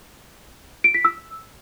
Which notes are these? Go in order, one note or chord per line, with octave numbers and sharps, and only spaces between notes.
D7
B6
E6